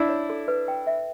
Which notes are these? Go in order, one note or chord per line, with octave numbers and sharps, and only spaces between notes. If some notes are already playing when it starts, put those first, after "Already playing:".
Already playing: D4 E4
C#5
A4
B4
G5
E5